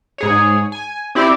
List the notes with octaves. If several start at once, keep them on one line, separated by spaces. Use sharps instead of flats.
G#2 G#4 C#5
G#5
C4 E4 G4 D5 C6 D6